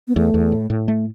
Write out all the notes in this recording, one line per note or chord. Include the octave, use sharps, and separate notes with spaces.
B3
E2 A3
E2
A2
A2
A3